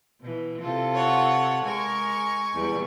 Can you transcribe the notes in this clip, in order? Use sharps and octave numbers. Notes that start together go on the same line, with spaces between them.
B2 E3
C3 F4 A4
C#5 F#5
G#3 A#4 G#5 C#6
E2 G3 B3